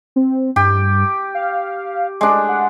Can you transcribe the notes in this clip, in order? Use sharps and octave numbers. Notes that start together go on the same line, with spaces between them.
C4
G2 G4
F5
G#3 D4
F#5